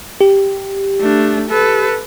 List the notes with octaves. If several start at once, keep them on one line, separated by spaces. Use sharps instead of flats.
G4
A3 D4
A4 B4